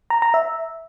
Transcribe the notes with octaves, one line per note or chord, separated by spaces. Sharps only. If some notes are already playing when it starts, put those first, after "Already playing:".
A#5
A#5
E5